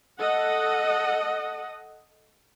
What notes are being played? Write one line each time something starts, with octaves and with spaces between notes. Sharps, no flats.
A4 D#5 F#5